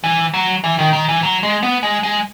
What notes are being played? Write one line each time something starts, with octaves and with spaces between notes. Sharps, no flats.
E3
F#3
E3
D#3
D#3
E3
F#3
G#3
B3
G#3
G#3